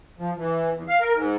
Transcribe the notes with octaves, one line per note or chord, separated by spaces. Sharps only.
F3
E3
E2
F5
A#4
G#2